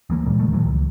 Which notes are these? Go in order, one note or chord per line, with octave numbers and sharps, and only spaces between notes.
D2 E3 A#3
A#2 G3 G#3
D#1 D#3 G3 A3
A#2 D#3 E3 F#3
C#2